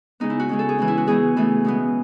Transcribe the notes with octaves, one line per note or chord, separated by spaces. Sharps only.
C#3 G#3 B3 D#4
E4
F#4
C#3 G#3 C#4
A4
G#4
E3 G#3 C#4
E4
F#4
C#3 E3 G#3 B3 G#4
C#3 E3 A3 C#4
B2 G#3 B3